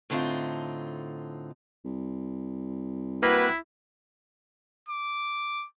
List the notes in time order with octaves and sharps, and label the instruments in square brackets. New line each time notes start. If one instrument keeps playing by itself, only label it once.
[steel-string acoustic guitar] A2 D3 C4 D#4 F4
[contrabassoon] C2
[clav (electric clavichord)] A#3 [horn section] C4 F#4 B4 [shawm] E4
[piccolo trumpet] D6